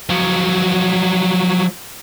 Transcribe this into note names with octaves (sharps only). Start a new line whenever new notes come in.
F3 F#3